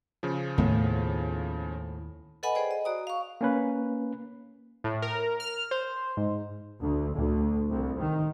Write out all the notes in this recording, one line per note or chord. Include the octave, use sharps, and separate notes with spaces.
C#3 F3
D#2 A2 B3
A4 B4 D#5 F#5 G#5 B5
G#4 C5 D5 G5
D#5
F#4 D5 A#5 D#6
F5 C#6
A#3 C#4 B4
A2
A#4
F6
C5
G#2
D2
D2
C2
D#3